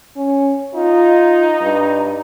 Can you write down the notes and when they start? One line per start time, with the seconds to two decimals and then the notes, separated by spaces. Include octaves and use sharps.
0.17 C#4
0.74 D#4 F4
1.62 G2